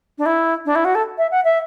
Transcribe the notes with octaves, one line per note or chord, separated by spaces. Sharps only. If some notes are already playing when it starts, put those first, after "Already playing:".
D4
E4
D4
E4
F#4
A4
E5
F#5
E5